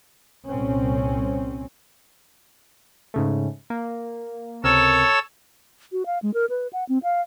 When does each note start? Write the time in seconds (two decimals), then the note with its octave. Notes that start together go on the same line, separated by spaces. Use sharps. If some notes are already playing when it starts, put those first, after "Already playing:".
0.47 C2 A#2 C4 C#4
3.14 G#2 C#3 A3
3.70 A#3
4.64 C#2 C3 A4 A#4 C#5 E6
5.92 F#4
6.06 F5
6.23 G#3
6.34 A#4
6.50 B4
6.73 F#5
6.89 C4
7.03 F5